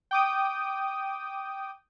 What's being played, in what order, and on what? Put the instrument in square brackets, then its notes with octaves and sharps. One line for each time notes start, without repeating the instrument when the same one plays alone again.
[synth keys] G5 D6 D#6